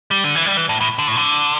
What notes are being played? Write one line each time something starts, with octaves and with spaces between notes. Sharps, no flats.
G3
D3
E3
G3
E3
A2
A2
D3
A2
D3